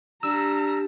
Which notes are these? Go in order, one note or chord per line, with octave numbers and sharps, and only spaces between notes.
G3 D4 A#5 E6